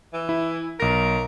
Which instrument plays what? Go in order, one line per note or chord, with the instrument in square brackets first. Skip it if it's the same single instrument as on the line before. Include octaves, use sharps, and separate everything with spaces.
[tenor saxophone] E3
[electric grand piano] E4
[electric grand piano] B1 A#6 [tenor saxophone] A#4